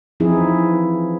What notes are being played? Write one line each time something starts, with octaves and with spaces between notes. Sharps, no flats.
E3 F3 C4 D#4 E4 G#4